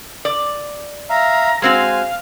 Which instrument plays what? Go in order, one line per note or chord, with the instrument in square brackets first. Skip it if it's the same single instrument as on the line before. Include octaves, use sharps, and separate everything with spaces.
[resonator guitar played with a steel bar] D5
[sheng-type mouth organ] E5 F5 [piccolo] A#5
[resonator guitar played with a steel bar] G#3 C4 F#4 [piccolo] F5 [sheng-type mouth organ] G#5